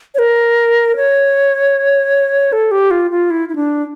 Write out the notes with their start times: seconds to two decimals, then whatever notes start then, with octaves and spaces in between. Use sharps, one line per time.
0.15 C#5
0.19 A#4
0.96 C#5
2.53 A4
2.71 G4
2.91 F4
3.11 F4
3.30 E4
3.49 E4
3.56 D4